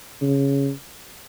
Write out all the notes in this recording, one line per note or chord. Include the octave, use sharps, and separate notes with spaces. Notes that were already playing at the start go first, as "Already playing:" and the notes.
C#3